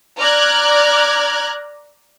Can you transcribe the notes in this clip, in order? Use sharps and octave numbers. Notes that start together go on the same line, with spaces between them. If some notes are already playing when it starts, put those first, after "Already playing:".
D5 A#5 F6 F#6 G#6